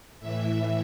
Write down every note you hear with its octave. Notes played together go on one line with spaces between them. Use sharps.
A2 E3 E5